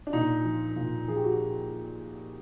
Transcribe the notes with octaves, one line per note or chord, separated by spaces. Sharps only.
D4
A#2 D#4
F3
A#2
F3 G#4
G4
F#4